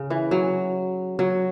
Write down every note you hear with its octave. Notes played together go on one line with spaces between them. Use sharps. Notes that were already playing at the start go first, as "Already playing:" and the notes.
Already playing: C#3
E3
F#3
F#3